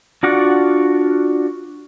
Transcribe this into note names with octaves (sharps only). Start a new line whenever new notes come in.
D4 F4 F#4 D5 F#5